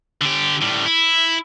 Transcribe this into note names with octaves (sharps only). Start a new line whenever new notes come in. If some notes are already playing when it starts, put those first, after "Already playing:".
D3 G4
A2 G3
E4